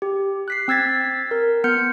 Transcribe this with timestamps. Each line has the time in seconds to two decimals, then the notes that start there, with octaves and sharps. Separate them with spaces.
0.02 G4
0.48 F#6 B6 C7
0.68 C4 E6 G#6 A6 B6
1.31 A#4
1.64 B3 F6 G6 C#7